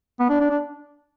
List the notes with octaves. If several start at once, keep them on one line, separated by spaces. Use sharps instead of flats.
B3
D4
D4
D4